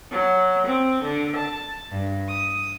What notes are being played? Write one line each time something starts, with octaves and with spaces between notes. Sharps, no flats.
F#3
C4
D3
A5
G2
D#6